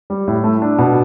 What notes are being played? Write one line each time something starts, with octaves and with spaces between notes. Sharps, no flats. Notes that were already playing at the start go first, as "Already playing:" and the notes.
G3
A2
A3
D4
B2